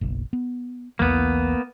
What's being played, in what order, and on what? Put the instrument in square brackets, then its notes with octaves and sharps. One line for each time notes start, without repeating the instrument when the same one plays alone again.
[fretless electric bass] F#1 B1
B3
[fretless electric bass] B1 E2 E3 [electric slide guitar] A#3 B3